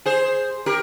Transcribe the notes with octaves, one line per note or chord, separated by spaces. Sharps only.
G#4 C5
G4 A#4